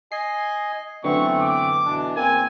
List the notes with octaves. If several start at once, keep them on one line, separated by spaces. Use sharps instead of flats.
D#5 G#5 C7
F#2 D3 E3 A3 B3 C4 C#6
D6
B2 E3 D4
E2 A#3 C4 G#5